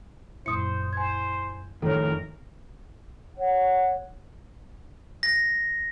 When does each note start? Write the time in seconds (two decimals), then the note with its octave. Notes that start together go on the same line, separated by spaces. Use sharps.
0.46 F#2 A#2 E4 C5 D#6 C#7
0.93 C5 G#5 G#6
1.82 F2 A2 D#3 A4 A#4 C#5
3.38 C#5 F#5
5.23 A#6